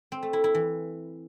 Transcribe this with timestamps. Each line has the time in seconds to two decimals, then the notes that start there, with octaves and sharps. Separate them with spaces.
0.12 C4
0.22 A3
0.33 E4
0.44 E4
0.55 E3